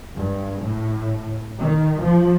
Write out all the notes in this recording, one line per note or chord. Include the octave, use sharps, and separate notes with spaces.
G2
A2
D#3
F3